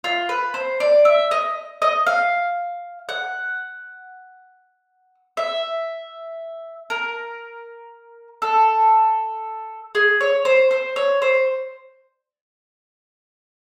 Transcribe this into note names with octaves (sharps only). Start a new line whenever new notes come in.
F4
B4
C5
D5
E5
D#5
D#5
F5
F#5
E5
A#4
A4
G#4
C#5
C5
C5
C#5
C5